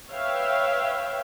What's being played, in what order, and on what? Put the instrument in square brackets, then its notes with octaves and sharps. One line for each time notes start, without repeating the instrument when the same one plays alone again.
[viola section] B4 C#5 E5 F5 G5